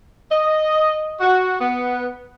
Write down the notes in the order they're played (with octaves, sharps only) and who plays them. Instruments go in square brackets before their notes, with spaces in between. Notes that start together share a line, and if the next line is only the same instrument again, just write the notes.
[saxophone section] D#5
F#4
B3